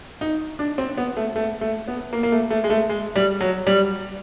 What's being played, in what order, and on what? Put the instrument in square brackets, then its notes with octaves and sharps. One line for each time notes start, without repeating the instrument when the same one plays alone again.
[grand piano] D#4
D4
C4
B3
A3
A3
A3
B3
A#3
A#3
A3
A3
G#3
A3
G#3
G3
F#3
G3